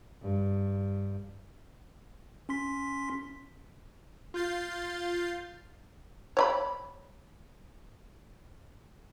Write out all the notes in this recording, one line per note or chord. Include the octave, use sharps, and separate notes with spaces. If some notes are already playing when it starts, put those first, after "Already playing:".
G2
C#4 C6 B6
F4 G6 A6 C7
C#5 D5 B5